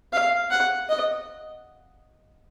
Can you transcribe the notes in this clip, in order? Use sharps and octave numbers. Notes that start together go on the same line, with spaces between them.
F5
F#5
D#5